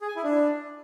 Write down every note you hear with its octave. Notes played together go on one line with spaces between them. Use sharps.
G#4
G#5
E4
D4